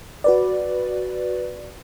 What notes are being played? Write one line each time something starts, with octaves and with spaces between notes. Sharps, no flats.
F#4 B4 D5